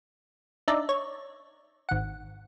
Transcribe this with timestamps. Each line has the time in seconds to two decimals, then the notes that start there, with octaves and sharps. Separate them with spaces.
0.68 D4 D#4 D5 E5
0.89 C#5
1.89 G#1 F#5